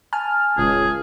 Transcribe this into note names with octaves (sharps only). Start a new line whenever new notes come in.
G#5 A5 F6
D#1 C#2 G#4